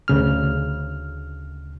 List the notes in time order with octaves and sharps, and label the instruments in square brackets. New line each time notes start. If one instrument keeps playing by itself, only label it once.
[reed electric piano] D2 C#3 F6